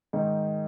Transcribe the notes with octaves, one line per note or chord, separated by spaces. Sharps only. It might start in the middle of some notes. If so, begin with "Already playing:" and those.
G#2 D#3 G#3 D#4